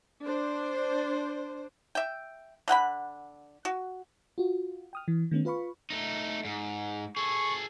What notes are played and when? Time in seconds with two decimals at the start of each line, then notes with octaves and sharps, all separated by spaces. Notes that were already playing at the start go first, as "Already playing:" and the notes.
0.23 D4 C5
1.95 E5 G5
2.68 D3 F#5 G5 B5
3.65 F#4
4.38 F4 F#4
4.93 G5 D#6 F6
5.08 E3
5.31 D#3 A3 B3 C#4
5.45 F4 B4 F5 B5 C#6
5.90 A3 D#4
6.45 G#2
7.17 G#4 A4 C#6